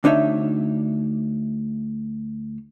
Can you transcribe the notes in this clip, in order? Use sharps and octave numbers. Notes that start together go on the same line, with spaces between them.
D2 D4 D#4 C#5 E5